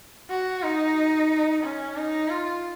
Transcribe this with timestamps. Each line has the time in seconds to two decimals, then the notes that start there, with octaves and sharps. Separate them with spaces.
0.30 F#4
0.63 D#4
1.63 C#4
1.97 D#4
2.29 F4